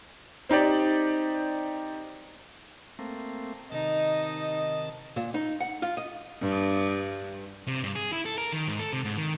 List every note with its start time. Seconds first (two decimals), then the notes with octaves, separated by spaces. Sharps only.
0.49 C4 D#4 G4 D5
2.99 A3 A#3 C4
3.72 C3 D#3 D#4 D#5 A5
5.16 A#2
5.34 D#4
5.61 F#5
5.82 F4
5.97 D#5
6.40 G2
7.67 C3
7.84 G2
7.96 G#4
8.13 E4
8.26 A4
8.38 A#4
8.52 D#3
8.67 G#2
8.79 A4
8.93 C3
9.05 G#2
9.17 D#3